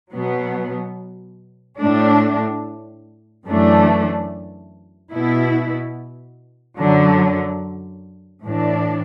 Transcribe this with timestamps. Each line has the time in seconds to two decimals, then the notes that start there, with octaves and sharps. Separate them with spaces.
0.14 B2 F#3 B3
1.80 A2 A3 D4
3.47 F#2 E3 A3 D4
5.12 B2 B3 E4
6.78 F#2 D3 F#3
8.44 A2 E3 D4